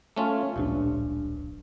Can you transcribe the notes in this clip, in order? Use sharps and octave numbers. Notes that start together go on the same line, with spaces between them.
A3 C#4 F4
D1 A#1 G2 D4